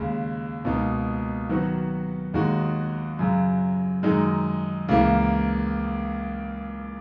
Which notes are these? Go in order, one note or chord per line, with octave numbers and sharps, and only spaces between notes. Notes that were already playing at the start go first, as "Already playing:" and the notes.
Already playing: D#2 C#3 G#3
C#2 B2 A#3 D#4
D#3 F#3 B3 F#4
D#2 D#3 G#3 D#4 F#4
F#2 C#3 F#3
F#2 D#3 G#3 D#4
C#2 C#3 E3 A#3